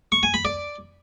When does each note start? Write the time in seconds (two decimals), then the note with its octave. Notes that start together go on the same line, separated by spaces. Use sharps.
0.12 C#6
0.23 G#5
0.34 B5
0.45 D5